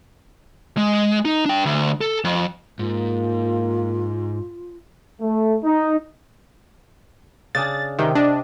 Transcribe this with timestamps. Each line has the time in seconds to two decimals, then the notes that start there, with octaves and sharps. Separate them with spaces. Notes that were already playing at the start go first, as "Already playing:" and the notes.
0.77 G#3
1.25 D#4
1.46 D4 G5
1.65 D2
2.01 A4
2.24 F2
2.79 G#2 A#3 F4
5.21 A3
5.64 D#4
7.55 C#3 D4 G#4 A6
7.99 C3 D#3 G5
8.15 D4 D#5